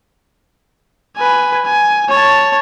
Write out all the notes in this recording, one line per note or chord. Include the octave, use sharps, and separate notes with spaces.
B4 G#5
G#5
C#5 A5